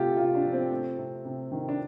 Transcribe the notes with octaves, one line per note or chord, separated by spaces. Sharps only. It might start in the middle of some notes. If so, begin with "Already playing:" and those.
Already playing: C3 A3 F4 G4 A4
C3 F4
D4
F3
C4
A3
C3
C3
D#3
D4